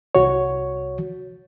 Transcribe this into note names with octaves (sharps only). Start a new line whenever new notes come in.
C2 F#4 C#5